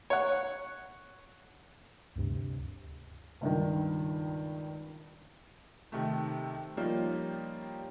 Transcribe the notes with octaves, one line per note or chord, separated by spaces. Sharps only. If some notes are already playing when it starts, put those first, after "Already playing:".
C#5 F#5
D2 G2 C3
C#2 G2 D#3
C3 D#3 A3
F3 G3 A#3 C#4 D#4 F4